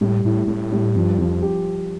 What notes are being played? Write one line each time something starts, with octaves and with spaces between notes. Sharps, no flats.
A2 G3
A2 E4
A2 G3
G3
G2 F3
F2 F3
G4